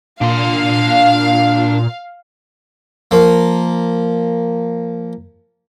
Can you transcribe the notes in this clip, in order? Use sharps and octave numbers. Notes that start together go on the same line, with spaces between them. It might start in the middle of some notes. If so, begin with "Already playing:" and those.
A#2 D4 F5 C6
F3 A#3